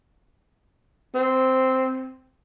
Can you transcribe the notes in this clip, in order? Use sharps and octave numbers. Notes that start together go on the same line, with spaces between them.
C4